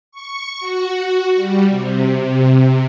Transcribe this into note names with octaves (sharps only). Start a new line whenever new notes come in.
C#6
F#4
G3
C3